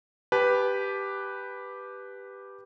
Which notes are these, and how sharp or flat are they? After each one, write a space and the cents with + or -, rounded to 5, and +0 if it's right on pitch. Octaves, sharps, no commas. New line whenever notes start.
G4 +0 B4 +0 A5 -35